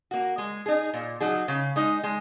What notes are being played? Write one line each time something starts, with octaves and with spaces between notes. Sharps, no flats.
A#3 F#4
G#3
D#4 G#4
A#2
F#3 D#4 G#4
C#3
G#3 D#4
G#3